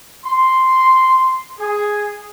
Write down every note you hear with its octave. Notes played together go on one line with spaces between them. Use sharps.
C6
G#4